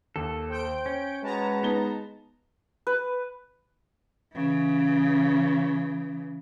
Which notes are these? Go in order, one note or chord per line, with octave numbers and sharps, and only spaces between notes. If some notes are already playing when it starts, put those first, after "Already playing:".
D#2 A4
C5 G5 G6 D7
C#4 C#5
G#3 F#4 B4 A5 A#5
B3 D#4 G7
B4
C#3 E3